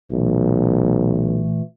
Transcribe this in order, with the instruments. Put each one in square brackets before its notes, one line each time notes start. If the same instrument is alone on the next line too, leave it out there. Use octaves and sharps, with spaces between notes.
[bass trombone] B1 [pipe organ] A#2 E3 A3